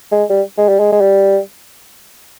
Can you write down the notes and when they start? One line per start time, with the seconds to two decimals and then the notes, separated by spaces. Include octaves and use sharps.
0.11 G#3
0.29 G3
0.58 G#3
0.68 G3
0.79 G#3
0.92 G#3
1.01 G3